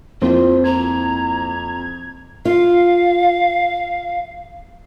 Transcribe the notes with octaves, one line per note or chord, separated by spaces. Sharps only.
F2 A#3 C4 E4 F4 C5
A#5 G#6
F4 F5